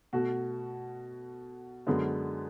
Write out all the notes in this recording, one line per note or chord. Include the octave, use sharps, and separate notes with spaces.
B2 A3 F#4
F#2 D3 G#3 B3